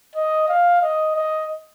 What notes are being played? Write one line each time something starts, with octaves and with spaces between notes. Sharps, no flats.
D#5
F5
D#5
D#5